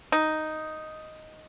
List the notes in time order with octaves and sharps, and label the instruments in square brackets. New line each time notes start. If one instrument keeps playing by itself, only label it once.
[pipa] D#4